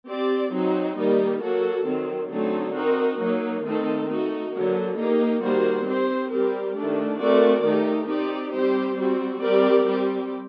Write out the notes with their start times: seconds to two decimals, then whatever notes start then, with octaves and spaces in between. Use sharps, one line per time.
0.09 C4 G4 D5
0.53 F#3 C4 D#4
0.98 D#3 G3 A#3 D#4
1.42 F#3 A#3 F#4 A4
1.86 D#3 F#3 C4
2.31 D3 F#3 A3 C4 D#4
2.75 C4 D#4 F#4 A#4
3.20 F#3 A#3 D#4
3.64 D#3 A3 C4 D#4 A4
4.09 A3 D#4 F#4
4.53 D3 F#3 A#3
4.98 A#3 D#4 G4
5.42 D#3 G3 A#3 F#4 C5
5.87 C4 G4 C5
6.31 G3 C4 G4 A#4
6.76 D#3 A3 D4
7.21 A3 C4 F#4 A#4 D5
7.65 D#3 A3 D#4 G4
8.09 C4 D#4 G4 D5
8.54 G3 C4 G4 C5
8.98 G3 C4 F#4
9.42 G3 C4 G4 A#4 D5
9.87 G3 C4 G4